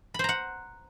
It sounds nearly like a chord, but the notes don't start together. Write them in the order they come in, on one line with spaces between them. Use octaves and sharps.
B5 C5 A#5 F#5